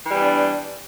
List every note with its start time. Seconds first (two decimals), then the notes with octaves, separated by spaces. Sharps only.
0.06 E3
0.11 G3
0.15 B3
0.20 D4